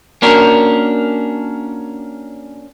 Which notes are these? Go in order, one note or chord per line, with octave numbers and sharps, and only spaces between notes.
A#3 C#4 D4 F#4 A#4